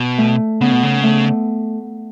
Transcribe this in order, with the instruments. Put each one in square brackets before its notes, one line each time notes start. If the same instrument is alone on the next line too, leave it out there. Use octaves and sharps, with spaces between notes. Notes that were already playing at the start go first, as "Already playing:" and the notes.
Already playing: [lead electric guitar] B2
[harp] A3
[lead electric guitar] C#3 [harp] B3
[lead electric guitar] B2
C#3
[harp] A3